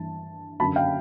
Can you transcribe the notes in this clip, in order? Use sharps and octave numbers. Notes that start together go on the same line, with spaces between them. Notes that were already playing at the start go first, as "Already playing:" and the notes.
Already playing: G2 E3 A5
F#2 D3 F#3 A5 B5
F5 G5